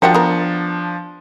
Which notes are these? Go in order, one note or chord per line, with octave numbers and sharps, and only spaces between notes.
F3 D4 F#4 G4 A#4 C#7
B3 A#4